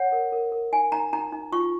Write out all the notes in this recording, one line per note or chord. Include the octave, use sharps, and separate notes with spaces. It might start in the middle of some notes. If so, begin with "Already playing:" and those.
Already playing: C#5 F#5
A#4
A#4
A#4
D#4 G#5
D#4 A#5
D#4 A#5
D#4
F4 C#6